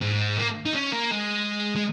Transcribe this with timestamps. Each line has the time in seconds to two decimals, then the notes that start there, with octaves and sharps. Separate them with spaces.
0.02 G#2
0.38 A#3
0.65 D#4
0.74 C#4
0.92 A#3
1.11 G#3
1.76 G#3